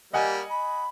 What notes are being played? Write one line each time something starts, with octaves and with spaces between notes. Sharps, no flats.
G3 A#3 D#5 F#5 G#5
B5